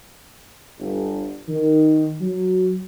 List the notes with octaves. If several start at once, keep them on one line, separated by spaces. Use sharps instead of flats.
G1
D#3
F#3